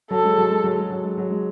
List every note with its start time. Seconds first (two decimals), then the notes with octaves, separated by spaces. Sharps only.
0.11 F#3 A4
0.24 G#3
0.38 F#3
0.51 G#3
0.64 F#3
0.77 G#3
0.90 F#3
1.03 G#3
1.18 F#3
1.31 G#3